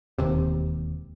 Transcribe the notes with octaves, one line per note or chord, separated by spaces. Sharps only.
E1 D#2 C3